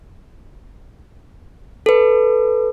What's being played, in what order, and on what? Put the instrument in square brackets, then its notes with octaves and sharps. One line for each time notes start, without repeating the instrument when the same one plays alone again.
[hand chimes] A4 B4